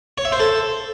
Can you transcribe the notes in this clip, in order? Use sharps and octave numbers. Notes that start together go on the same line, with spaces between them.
C#5
E5
C5
A4